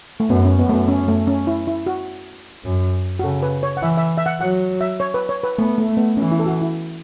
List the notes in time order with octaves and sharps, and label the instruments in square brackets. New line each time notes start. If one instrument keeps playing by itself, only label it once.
[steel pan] A3
[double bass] F#2 [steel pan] B3
[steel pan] C#4
[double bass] F#2 [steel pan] B3
[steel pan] A3
B3
C#4
A3
C#4
E4
E4
F#4
[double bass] F#2
[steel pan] F#4
[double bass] C#3 [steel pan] A4
[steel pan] B4
C#5
F#5
[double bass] E3 [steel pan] E5
[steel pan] E5
E5
F#5
[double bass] F#3 [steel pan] F#5
[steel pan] E5
C#5
B4
C#5
B4
[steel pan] A3 [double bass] B3
[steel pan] A3
[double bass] A3
[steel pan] B3
[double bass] E3 [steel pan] C#4
[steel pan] E4
A4
F#4
E4